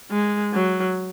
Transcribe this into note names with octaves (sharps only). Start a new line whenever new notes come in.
G#3
F#3